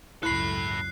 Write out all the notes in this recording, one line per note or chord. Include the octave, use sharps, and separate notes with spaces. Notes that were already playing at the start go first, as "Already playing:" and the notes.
C#2 F#2 E4 A4 B5 F#6 C7